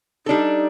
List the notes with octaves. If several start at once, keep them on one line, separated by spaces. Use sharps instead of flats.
G3 D4 D#4 A4